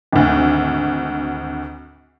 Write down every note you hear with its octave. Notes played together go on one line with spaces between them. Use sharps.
G#1 D2